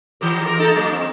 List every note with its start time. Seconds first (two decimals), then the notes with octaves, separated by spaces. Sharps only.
0.21 E3 G4 A#4
0.42 F4 A#4
0.58 A#3 D#4 A4
0.76 F#3 A#3 D#4
0.92 C4